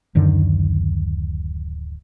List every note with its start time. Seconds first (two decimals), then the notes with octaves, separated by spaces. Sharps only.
0.15 D1 F#2 D3 D#3